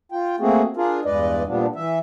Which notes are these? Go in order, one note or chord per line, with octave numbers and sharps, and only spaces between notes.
F4 G5
A3 A#3 C4 F#4 G#4
D4 F4 G#4 A#4
E2 G2 G#3 B4 D5 D#5
A#2 F3 G3 B3 D4
E3 E5